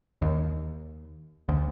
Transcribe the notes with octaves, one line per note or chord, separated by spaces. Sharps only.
D#2
D2